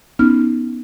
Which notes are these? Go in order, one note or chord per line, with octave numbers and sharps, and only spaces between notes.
B3 C#4 D#4 F6